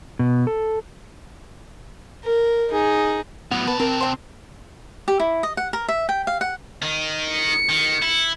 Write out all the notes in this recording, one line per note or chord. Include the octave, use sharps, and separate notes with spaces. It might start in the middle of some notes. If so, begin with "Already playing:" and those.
B2
A4
A#4
D#4 G#4
A2 F#3 B3
C3 B4 A5
C4 A#4
C5 G5
G4
E4
D#5
F#5
A#4
E5
G5
F5
F#5
D#3 D#4
C#7
D#3
E4